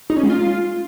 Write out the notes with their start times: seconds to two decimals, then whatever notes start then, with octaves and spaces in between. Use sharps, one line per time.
0.10 D#4
0.16 C#4
0.23 G#3
0.30 F4